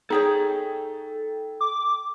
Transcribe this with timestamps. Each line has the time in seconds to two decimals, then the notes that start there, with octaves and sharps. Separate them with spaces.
0.10 D#4 G#4 A4 C#5 G5
1.61 D6